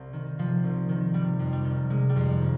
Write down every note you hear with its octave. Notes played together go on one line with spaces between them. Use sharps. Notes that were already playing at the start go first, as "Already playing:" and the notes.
Already playing: C2 C3 C4
D#3
C3 F3
C2
D#3
C3 G3
F2
G3
D#3
C3 G#3
G3
F2
D#3